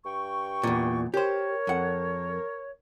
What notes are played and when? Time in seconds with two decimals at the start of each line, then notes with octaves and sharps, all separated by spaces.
0.06 G2 G5 C#6
0.63 E2 A#2
1.14 G4 A#4 C5 C#5
1.67 F2 F#5